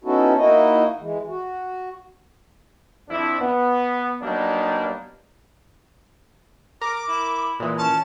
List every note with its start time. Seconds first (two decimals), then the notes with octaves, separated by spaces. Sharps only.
0.04 B3 C#4 D#4 E4 F#4 A4
0.37 A#3 D#4 E4 F#4 D#5
1.00 E3 G#3
1.28 F#4
3.09 F2 D4 E4
3.41 B3
4.22 F#3 G3 A#3 B3 D4 D#4
6.81 A#4 D6
7.08 E4
7.60 A#2 E3 G#3
7.78 C#4 A5